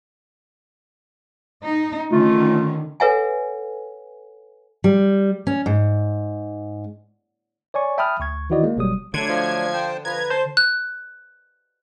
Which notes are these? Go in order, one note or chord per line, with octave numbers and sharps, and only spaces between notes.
D#4
D3 D#3 A3 C#4 F4
A4 B4 C#5 E5 F#5 G#5
G3
C#4
G#2
C#5 D5 G#5 C#6
E5 G5 A5 B5 D#6 F6
D2 C#6 G#6
D#3 E3 E4 F#4 D5 D#5
G#3 A#3
G1 B2 F#3 G3 D#6
D3 F#3 A3 D4 G#6
F3
C5 G5 A5
F3 B4 A#5 G#6
C5 A5
F#6